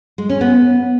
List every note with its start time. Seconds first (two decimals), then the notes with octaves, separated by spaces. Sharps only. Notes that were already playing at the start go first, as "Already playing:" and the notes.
0.18 G#3
0.29 C#4
0.41 B3